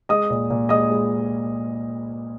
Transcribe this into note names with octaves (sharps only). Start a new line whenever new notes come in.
G#3 D#5 D#6
A#2
A#2
G#3 D#5 D#6
G#3